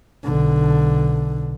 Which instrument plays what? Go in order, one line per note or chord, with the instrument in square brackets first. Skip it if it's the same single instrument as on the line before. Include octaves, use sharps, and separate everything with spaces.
[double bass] B1 D3